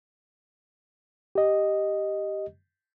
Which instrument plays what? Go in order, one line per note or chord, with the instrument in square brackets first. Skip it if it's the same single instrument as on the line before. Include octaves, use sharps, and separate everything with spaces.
[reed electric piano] G4 D#5